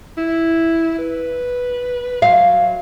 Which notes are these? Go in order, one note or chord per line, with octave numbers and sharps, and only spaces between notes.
E4
B4
F#3 F5